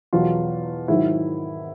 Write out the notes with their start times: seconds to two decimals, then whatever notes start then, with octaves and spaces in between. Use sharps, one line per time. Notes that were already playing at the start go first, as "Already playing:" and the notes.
0.13 E2 B2 F#3 F4
0.88 G#2 D#3 F#3 E4